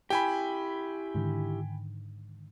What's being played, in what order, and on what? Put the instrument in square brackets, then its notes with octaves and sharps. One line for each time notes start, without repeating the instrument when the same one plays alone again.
[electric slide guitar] E4 G4 [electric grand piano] G5 G#5 B5
[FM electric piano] G#2 D3 D#3